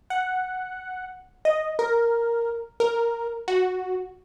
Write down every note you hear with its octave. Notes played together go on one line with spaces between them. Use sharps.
F#5
D#5
A#4
A#4
F#4